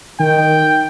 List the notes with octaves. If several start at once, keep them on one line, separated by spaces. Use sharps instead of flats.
D#3 G5